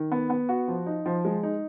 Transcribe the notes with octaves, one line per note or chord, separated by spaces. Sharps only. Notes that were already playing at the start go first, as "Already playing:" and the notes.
Already playing: D#3
B3
B3
F#4
F3
D#4
F3
G#3
D#4